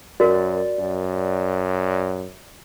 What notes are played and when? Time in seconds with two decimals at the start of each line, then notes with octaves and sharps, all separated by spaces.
0.20 F#2 F#4 A#4 D5
0.79 F#2